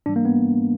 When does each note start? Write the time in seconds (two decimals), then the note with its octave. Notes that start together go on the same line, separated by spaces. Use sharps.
0.06 G#2 E3 G3 D4
0.16 A#3
0.25 B3